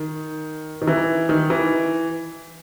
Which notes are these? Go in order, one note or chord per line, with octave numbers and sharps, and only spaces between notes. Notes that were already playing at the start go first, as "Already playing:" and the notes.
Already playing: D#3
D#3
E3
D#3
E3